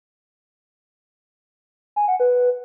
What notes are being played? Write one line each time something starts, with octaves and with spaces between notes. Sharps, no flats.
G#5
F#5
B4